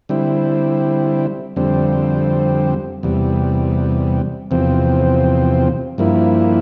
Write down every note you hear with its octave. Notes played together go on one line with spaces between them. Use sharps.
D3 G3 C4 E4
F2 D3 G3 C4
E2 C3 G3
E2 C3 F3 C4
G2 F3 A#3 E4